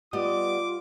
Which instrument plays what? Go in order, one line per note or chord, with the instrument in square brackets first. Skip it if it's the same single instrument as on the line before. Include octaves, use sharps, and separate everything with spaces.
[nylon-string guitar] G3 B3 D#5 [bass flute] F4 [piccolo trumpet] D6